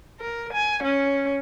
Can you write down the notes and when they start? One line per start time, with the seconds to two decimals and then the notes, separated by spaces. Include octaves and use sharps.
0.20 A#4
0.53 G#5
0.83 C#4